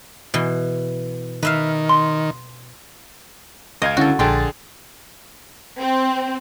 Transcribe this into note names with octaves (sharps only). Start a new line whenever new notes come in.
B2 E3
D#3 B4 E5 F5
C6
C#2 D#5 F5 G#6
D3 C#4 E4 F#4 A4
A#1 D3 G4 G#4 G5 A5 C6 A6
C4